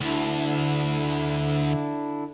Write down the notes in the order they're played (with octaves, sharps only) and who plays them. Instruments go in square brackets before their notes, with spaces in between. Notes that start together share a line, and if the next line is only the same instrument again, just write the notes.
[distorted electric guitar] D2 [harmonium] D3 D4 E4